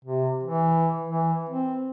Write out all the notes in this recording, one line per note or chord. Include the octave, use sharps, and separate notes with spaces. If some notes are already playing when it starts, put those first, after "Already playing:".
C3
E3
E3
C4